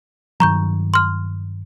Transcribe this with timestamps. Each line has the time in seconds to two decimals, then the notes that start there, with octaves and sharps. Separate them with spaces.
0.40 G2 D#3 F#3 A#5 C#6 G6
0.94 C6 F6